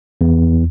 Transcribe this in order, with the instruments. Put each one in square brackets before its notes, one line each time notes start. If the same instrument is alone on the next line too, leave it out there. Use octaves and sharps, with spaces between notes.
[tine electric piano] E2